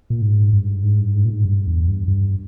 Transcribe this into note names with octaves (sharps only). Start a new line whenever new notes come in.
A#2
G#2
G2
G#2
G2
G#2
A#2
G#2
G2
E2
G2
G2